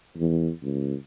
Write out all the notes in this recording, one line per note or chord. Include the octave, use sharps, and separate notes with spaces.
E2
C#2